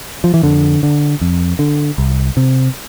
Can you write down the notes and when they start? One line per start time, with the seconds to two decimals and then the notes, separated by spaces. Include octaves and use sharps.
0.24 F3
0.34 E3
0.43 F2 D3
0.83 D3
1.21 F2
1.59 D3
1.98 C2
2.37 C3